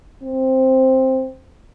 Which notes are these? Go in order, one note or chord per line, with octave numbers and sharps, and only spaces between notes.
C4